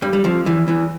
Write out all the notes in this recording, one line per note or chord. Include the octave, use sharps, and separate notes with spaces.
G2 G3
G3
F2 F3
E2 E3
E2 E3